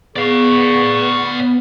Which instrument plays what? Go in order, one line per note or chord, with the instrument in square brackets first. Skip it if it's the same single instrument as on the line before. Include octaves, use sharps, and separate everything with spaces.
[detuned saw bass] B3 [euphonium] G#4 [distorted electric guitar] D5 F5 [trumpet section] C#6